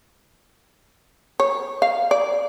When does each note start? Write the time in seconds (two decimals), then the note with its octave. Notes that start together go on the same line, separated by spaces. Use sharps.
1.40 C#5
1.82 F5
2.11 D5